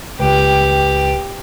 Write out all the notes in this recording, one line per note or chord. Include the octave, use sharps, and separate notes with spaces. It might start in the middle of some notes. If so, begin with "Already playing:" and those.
C#2 G4 B4 G5